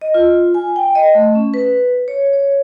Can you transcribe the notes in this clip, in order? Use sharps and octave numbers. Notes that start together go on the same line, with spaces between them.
D#5
F4
G#5
G5
D#5
A3
C#4
B4
C#5
C#5